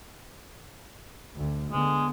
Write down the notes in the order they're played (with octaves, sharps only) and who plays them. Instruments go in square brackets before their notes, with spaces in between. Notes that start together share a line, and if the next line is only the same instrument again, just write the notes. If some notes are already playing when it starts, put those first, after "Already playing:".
[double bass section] D2
[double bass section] D3 B3 [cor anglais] G#3